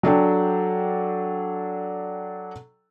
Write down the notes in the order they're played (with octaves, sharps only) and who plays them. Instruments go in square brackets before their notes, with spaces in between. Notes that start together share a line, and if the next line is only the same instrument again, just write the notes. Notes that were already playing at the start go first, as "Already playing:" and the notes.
[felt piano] F#3 D4 A4 G5